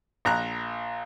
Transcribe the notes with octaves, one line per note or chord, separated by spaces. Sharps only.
A#1 A#5 F#6